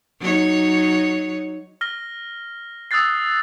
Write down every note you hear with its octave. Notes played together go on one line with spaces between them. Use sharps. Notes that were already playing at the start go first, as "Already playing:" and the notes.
F#3 D#4 C#5
F6 A#6 G7
D#6 E6 F#6 A6 C7